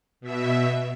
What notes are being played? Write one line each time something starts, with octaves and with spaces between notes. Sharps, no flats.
B2 E5